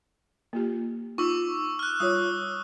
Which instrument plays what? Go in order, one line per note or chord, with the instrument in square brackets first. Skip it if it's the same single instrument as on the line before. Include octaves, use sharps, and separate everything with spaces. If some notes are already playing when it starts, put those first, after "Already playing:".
[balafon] A#3 F4 G4
[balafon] D#4 F4 [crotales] C#6 D6 E6
[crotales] F6 F#6
[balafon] G3 F4 C#5 [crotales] D#6